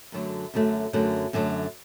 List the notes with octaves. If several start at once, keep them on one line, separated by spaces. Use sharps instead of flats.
F#2 D3 F#3 A3
F#2 D3 F#3 A3
F#2 D3 F#3 A3
F#2 D3 F#3 A3